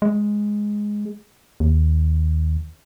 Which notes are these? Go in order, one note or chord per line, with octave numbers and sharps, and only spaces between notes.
G#3
D#2